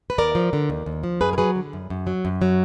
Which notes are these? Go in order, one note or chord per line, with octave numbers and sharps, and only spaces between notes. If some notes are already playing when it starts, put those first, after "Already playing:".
B4
D#2 A#4 D5
F3
D3
D#2
D#2
F3
F#2 G#4 B4
A#4
F#3 G#4 B4
D3
F#2
F#2
F#3
F#2
F#3